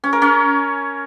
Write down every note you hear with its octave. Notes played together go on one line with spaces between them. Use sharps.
C#4
A#4
C#4